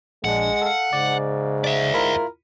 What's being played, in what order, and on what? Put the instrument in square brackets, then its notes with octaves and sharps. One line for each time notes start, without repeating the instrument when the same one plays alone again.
[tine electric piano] A#1 D4 [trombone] G#3 [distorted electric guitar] F#5
[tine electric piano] A4 F5
[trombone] G#2 [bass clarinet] C#3 [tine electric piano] D5
[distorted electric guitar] D5 E5
[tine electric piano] E4 F4 B5 [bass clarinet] A#4